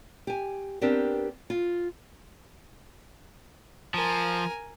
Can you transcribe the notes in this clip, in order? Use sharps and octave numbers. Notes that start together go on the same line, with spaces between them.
G4 G#5
B3 C4 D4 G4 A#4
F4
F3 A#4 G#5